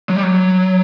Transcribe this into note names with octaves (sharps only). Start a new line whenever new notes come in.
F#3
G3
F#3